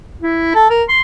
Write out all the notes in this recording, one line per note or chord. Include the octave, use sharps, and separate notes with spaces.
E4
A4
A#4
C6